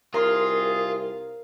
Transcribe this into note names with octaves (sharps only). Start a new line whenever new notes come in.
C2 F4 G#4 A#4 F5 C6